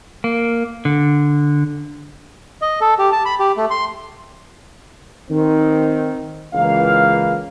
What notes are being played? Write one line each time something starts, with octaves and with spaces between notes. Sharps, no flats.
A#3
D3
D#5
A4
G4
A5
B5
G4
A3
C6
D#3 C4
C#2 E3 A#3 F5